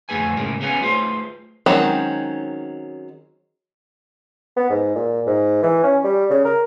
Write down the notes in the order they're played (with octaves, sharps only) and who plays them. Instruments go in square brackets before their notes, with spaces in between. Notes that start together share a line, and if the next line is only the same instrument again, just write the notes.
[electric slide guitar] F2 D3 A3 G#4 B4 G#5
A2 C#3 G#3 A#3 A#4
B3 C#4 G#4 B4 F5 G#5
A3 F4 G#4 B4 C5
[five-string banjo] D#3 F#3 G#3 C4 C#4
[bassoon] B3
G#2
A#2
G#2
E3
C#4
G3
C#3
A#4